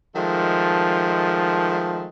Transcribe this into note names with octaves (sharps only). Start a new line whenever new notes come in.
D#3 F3 G#3 A3